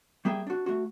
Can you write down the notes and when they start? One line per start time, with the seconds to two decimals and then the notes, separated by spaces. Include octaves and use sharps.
0.25 G3 A#3 G#4 E5 G5
0.47 D4 F#4
0.66 A3 F#4